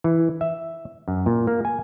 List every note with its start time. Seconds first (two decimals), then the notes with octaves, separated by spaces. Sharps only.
0.04 E3
0.41 E5
1.08 F#2
1.26 A#2
1.47 A#3
1.65 G#5